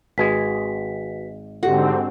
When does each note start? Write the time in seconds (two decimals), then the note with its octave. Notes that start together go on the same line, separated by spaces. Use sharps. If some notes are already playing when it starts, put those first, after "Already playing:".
0.18 G#1 G#3 F#4 G#4 B4 B6
1.63 G#2 D3 C4 F#4 G4 A4